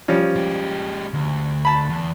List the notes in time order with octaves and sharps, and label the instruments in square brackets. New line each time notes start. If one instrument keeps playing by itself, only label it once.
[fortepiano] F3 G3 C#4
[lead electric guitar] G#3 G4
D2
[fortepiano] A5 B5
[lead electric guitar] E2